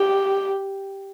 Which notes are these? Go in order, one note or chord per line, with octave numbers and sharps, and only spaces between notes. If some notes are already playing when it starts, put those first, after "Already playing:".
Already playing: G4